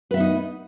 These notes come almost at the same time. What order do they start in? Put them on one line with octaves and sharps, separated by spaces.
B4 E5 B3 D#4 D#5